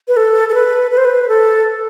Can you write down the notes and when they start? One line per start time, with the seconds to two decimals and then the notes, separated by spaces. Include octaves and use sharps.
0.08 B4
0.17 A4
0.49 A4
0.54 B4
0.91 B4
0.97 C5
1.05 B4
1.28 A4